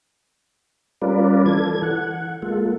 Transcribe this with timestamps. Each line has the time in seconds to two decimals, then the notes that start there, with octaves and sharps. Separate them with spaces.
1.01 G3 C#4 F4 A#4 B4 D5
1.46 E3 A4 G#6
1.83 F#5
2.42 G#3 A#3 F4 A4